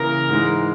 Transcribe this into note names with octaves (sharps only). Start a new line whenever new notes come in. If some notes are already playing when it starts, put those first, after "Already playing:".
Already playing: C#3 E3 A#3 A#4
G#2 E3 G#3